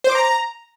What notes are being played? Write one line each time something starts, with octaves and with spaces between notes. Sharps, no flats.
C5
D6
A#5